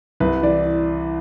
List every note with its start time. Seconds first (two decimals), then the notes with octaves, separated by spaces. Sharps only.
0.20 C2 B4
0.43 E3 D5